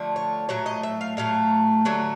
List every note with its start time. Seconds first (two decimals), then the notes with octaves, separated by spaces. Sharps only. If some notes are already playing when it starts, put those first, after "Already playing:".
Already playing: D3 F3 A3
0.16 C#5
0.49 A2 F#3 A3 C#5
0.66 D#5
0.83 E5
1.01 F5
1.17 A2 F#3 A3 F5
1.85 D3 F#3 A3